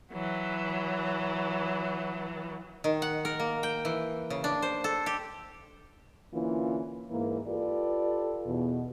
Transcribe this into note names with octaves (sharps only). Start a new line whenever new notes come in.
E3 F#3
D#3
F#5
A#4
A#3
G5
E3
C#3
D4
C5
A4
G4
D3 E3 A#3 C#4 F4
G#2 E3 A#3
F4 G4 A4 B4 D5
E2 B2